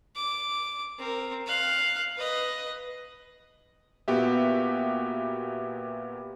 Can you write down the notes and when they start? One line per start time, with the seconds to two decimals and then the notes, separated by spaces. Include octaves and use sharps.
0.16 D6
0.99 C4 A#4
1.47 F5 F#6
2.18 B4 D#5
4.08 A#2 B3 F#4 G4 E5